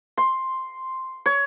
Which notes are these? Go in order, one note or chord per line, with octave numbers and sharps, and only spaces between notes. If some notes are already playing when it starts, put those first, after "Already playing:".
C6
C#5